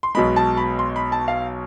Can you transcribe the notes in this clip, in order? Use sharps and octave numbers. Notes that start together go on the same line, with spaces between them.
C6
B1 B2 G#3 B5
A5
B5
C6
B5
A5
F5